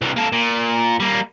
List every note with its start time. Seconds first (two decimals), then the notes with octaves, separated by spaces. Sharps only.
0.02 C2 E3
0.16 A#3 A4
0.32 A#2
1.00 G3 A#3